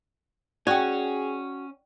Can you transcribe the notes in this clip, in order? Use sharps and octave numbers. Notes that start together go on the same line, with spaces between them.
C#4 F#4 G#4 D5 G5